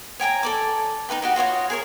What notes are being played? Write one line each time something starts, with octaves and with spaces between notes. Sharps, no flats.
C#5 G5 G#5 A#5
A4 D5 D6
D#4 E4 B4 G5
F#4 G4 D#5
F4 F#4 C#5 D#5
G#4 A#4 C#5